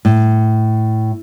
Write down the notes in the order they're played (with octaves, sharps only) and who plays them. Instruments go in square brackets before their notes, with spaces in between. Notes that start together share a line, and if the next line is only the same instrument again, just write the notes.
[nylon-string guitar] A2